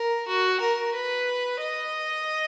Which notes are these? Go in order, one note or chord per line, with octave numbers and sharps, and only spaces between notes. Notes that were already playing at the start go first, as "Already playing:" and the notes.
Already playing: A#4
F#4
A#4
B4
D#5